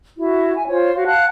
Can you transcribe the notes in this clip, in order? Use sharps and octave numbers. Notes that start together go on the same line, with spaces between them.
E4 F#4
G#5
F4 C5 C#5
F#4 F5
F5 F#5 A5 F#6